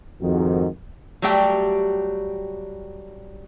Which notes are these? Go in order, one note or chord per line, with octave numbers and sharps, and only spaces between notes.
F2 G#2 D#3 F#4
F#3 G3 A3 G4 G5